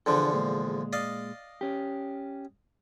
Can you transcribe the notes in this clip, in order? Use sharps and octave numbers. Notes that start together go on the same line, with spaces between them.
B1 E2 D3 F3 D4 A4
A#2 G#3
D5 D#5 F5
C#4 G4